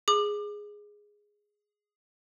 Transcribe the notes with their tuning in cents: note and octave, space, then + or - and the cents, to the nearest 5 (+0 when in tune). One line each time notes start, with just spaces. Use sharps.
G#4 +0 D6 +30